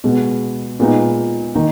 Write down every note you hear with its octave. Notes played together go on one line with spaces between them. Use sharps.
B2 G#3 B3
A#2 G#3 B3 D#4
D#3 A#3 D#4